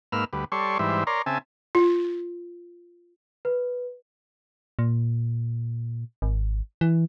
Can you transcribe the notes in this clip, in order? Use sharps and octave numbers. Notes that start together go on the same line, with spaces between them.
G#2 A#3 B4 E6 F6
D2 G3 B4
G3 A4 C#5 D5 C6 C#6
G#2 E3 G3 C5 E5
A#4 C#5 D5 A#5 C6
C#3 C4 E5 G#5 A5
F4
B4
A#2
G#1
E3